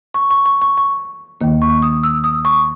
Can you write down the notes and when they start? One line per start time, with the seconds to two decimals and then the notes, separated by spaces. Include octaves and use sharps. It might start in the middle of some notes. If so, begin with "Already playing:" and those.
0.14 C#6
0.31 C#6
0.46 C#6
0.62 C#6
0.77 C#6
1.41 D#2 D#3 A#3
1.62 C#6
1.82 D#6
2.03 E6
2.24 D#6
2.45 C#6